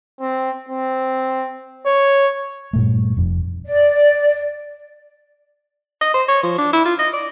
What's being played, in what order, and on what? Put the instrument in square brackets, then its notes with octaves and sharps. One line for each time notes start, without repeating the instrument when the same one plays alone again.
[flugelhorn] C4
C4
C#5
[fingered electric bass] G2 A#2 A3
F1 F2
[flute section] D5
[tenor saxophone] D#5
C5
C#5
F3
D4
E4
F4
D#5
D5